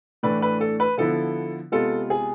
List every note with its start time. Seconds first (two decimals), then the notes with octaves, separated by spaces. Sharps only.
0.23 A2 E3 A3 D4 B4
0.42 B4
0.61 A4
0.80 B4
0.98 D3 F3 B3 E4 A4
1.72 C3 G#3 B3 F4 A4
2.10 G#4